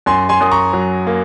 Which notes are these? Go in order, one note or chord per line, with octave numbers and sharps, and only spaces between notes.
F#2 G#5 C6
G#5 C6
F#2 D#6
A#5 C#6
F#3
A#3